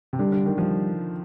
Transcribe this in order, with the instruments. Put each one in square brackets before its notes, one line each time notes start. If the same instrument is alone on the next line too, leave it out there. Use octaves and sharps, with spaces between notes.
[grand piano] C3
[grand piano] D3 [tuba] G3
[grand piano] D3
D#3
[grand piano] F3 [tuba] G3